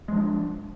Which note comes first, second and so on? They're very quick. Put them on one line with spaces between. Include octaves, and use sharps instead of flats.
G#3 F3 D4